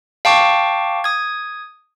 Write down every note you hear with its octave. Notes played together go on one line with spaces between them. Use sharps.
F5 G5 A5 C#6 D6
D#6 G#6